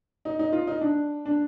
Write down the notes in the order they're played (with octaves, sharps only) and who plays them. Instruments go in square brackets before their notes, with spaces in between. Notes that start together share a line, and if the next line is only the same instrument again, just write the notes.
[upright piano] D#4
D#4
F4
D#4
D4
D4